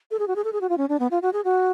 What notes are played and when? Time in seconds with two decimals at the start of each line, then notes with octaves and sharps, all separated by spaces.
0.11 A4
0.19 G#4
0.28 F#4
0.36 G#4
0.44 A4
0.53 G#4
0.61 F#4
0.69 F4
0.78 C#4
0.89 D4
0.99 B3
1.11 F4
1.22 F#4
1.33 G#4
1.44 F#4